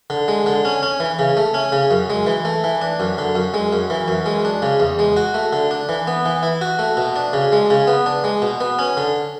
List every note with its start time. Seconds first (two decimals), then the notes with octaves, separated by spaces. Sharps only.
0.10 D3
0.28 G#3
0.46 D3
0.65 C#4
0.82 C#4
1.00 E3
1.19 C#3
1.37 A3
1.54 C#4
1.72 C#3
1.91 F#2
2.10 G#3
2.27 E3
2.45 A3
2.64 E3
2.81 D4
3.00 F#2
3.18 D3
3.35 F#2
3.54 G#3
3.73 F#2
3.90 E3
4.08 F#2
4.26 G#3
4.45 D4
4.62 C#3
4.80 E2
4.99 G#3
5.17 F#4
5.34 A3
5.53 D3
5.71 D4
5.89 E3
6.07 B3
6.25 E3
6.43 E4
6.61 F#4
6.79 A3
6.97 B2
7.16 D4
7.33 C#3
7.52 G#3
7.70 C#3
7.87 B3
8.06 D4
8.24 G#3
8.42 B2
8.61 B3
8.79 C#4
8.97 D3